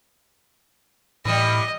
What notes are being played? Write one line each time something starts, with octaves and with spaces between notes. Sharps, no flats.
A2 E3 G3 D#5